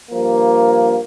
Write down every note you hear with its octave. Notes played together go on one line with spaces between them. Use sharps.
G2 F3 A#3